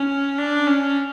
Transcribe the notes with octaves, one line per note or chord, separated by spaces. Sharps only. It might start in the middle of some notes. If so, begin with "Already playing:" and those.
Already playing: C#4
D4
C#4